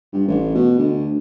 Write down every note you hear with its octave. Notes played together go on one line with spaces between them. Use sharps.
G2
A1
B2
D2